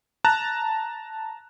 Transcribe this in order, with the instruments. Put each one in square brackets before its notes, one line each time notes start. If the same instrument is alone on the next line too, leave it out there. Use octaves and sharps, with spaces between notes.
[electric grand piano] A5 A#5 F#6